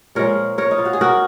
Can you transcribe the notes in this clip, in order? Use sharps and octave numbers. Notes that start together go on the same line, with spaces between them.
A#2 F3 G#3 A#4 C#5
A#4 C#5
D#4
F4
F#4
G#4
F#4 A#4